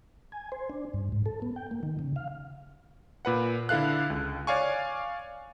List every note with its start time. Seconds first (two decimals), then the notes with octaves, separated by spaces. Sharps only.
0.32 G#5
0.52 C5
0.70 D4
0.94 G2
1.12 G#2
1.26 A4
1.42 B3
1.56 G5
1.71 A#3
1.83 D#3
1.99 C#3
2.16 F5
3.25 A#2 B4 F#5
3.69 D3 E4 A4 F5 F#6
4.10 C#2
4.47 C#5 D5 F5 G#5 C#6